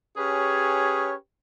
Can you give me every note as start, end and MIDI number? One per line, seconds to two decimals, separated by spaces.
0.17 1.14 61
0.17 1.14 67
0.17 1.14 68
0.17 1.14 71
0.17 1.14 73